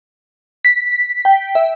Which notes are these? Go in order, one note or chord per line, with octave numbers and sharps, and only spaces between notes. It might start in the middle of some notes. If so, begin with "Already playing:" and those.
B6
G5
E5